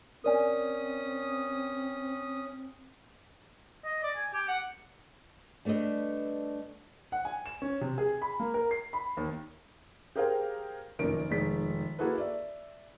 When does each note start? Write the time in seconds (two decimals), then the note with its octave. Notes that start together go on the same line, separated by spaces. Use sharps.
0.24 C4 C#4 A#4 D5 G#5 D#6
3.84 D#5
4.03 D5
4.16 G#5
4.34 G4
4.48 F#5
5.65 G3 A3 D4 B4 D#5
7.12 F#5
7.25 G#5
7.46 E7
7.62 C#4
7.81 C3
7.98 G#4
8.22 B5
8.40 A#3
8.54 A#4
8.71 C7
8.93 B5
9.17 D#2
10.16 G4 G#4 A#4 C5 F5 G5
10.99 F1 A#1 F#2 D#3 A#4 D7
11.30 F1 D#3 G#3 B6
11.99 A#3 E4 F#4 G#4 A4 B4
12.18 D5 E5